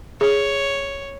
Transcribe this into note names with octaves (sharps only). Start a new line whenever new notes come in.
G#4 C#5